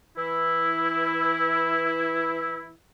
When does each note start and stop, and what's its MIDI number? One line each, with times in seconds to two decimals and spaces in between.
0.17 2.72 52
0.17 2.72 64